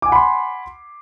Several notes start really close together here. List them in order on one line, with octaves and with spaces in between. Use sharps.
D6 G#5 F#5 B5 C6